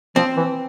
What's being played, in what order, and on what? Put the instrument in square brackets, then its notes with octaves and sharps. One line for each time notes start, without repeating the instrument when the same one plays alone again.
[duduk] F3 [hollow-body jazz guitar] C4
[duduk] E3